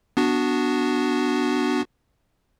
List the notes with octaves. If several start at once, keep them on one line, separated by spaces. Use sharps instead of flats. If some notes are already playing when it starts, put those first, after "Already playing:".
B3 D4 F#4